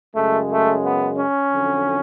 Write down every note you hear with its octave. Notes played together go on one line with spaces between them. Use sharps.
F#2 C#3 G#3 A3
A3
B3
C#4
F2 D3 F#3